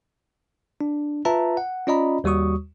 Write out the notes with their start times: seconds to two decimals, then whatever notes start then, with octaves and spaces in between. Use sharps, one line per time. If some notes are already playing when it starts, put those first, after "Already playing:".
0.81 D4
1.25 F4 B4 E5 A5 A#5
1.57 F#5
1.87 C#4 F4 D5 D#5 A#5 B5
2.24 D#2 G3 F#4 C#6 D#6